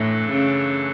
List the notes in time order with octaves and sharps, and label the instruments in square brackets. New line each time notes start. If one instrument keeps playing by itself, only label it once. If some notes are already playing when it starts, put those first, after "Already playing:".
Already playing: [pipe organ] F#2 E3 A3 D4 A4 [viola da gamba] A2
[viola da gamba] C#3